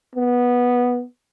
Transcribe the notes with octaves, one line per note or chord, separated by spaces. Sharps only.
B3